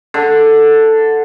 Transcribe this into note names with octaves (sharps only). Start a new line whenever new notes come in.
D3